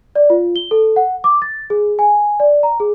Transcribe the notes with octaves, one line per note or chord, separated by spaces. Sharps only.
D5
F4
G7
A4
F#5
D6
A6
G#4
G#5
D5
A#5
G#4